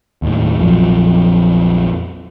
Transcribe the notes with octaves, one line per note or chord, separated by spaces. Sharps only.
D#2 A2
A#1 F2 F3 F#3